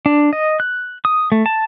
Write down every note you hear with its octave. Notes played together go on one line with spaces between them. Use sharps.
D4
D#5
F#6
D#6
A3
A5